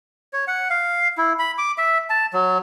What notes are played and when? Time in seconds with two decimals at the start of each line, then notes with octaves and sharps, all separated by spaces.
0.33 C#5
0.47 F#5
0.70 F5
1.18 E4
1.39 B5
1.58 D6
1.78 E5
2.10 A5
2.33 F#3